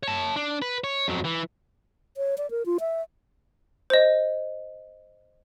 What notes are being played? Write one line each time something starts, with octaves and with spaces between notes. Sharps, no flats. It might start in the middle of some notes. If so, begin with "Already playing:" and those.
C#5 A5
D4
B4
C#5
F2 F#3
E3
C#5
D5
A#4
F4
E5
C5 D#5